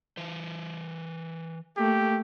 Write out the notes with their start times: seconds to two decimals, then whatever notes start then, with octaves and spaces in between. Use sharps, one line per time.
0.17 E3 C5
1.77 A3 A#3 G4